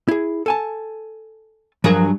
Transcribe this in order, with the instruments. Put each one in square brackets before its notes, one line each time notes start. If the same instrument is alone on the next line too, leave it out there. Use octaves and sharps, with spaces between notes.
[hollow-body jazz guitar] E4 G#4
A4 G#5 A5
[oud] G2 F#3 G#4 [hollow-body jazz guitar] F3 A#4